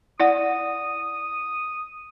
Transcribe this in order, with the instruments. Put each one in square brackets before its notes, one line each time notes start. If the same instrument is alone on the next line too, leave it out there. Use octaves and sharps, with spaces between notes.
[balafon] E4 D5 F#5 [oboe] D#6